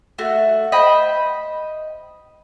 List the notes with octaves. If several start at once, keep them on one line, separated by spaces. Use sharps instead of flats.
A3 F#4
C5 D#5 G5 B5